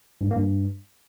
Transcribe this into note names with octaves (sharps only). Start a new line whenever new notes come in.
G2
G#2
A#3
G2